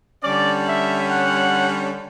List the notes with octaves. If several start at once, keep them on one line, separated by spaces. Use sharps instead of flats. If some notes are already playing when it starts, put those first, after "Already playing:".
D3 G3 C#4 D5
E5
F#5